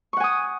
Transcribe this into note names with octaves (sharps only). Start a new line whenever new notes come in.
F#5 G#5 C#6 D#6